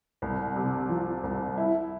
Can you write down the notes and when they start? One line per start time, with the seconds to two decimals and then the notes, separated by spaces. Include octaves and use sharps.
0.22 C2
0.56 C3
0.89 F3
1.24 C2
1.57 E4